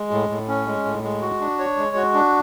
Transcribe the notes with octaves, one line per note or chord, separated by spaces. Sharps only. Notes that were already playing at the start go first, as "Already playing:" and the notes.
Already playing: G#3
A2
A2
C#4
G#3
A2
G#3
F#4
D4
C#5
G#3
F#4
D4